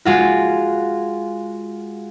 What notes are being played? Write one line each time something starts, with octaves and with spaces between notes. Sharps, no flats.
G#3 F4 F#4